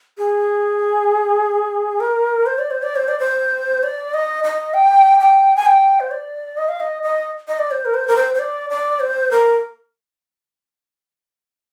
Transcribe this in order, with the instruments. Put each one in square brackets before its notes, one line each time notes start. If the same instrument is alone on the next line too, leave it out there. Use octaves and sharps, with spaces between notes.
[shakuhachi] G#4
A#4
C5
D5
C5
D5
C5
D5
C5
D5
D#5
D#5
G5
G5
G#5
G5
C5
D5
D#5
F5
D#5
D#5
D#5
D5
C5
A#4
C5
A#4
C5
C5
D5
D5
C5
A#4